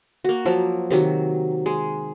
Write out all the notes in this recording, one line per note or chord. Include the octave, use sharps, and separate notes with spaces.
A#3 F#4
F3 F#3
C3 D#3 F#3
G#3